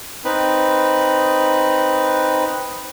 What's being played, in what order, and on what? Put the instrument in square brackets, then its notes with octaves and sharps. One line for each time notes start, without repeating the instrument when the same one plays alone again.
[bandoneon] C4 D#4 B4